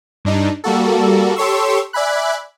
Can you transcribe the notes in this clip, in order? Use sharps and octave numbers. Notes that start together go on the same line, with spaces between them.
G2 D4 D#4
G3 A#3 F#4 A4
G4 A4 C#5 C6 C#6 E6
D5 E5 G#5 B5 F#6